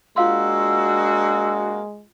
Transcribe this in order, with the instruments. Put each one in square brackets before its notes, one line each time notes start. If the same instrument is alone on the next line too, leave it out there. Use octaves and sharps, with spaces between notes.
[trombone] G#3 [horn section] A#3 D4 F#4 [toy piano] F4 F5 C6 [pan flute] E6